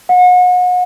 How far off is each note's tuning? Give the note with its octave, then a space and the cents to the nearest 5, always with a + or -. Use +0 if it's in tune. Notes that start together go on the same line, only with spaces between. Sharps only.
F#5 -35